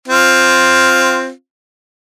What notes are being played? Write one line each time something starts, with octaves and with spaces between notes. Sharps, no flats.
C4 F4